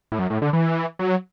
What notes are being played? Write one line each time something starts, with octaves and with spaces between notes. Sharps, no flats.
A2
F#2
A2
D3
E3
F#3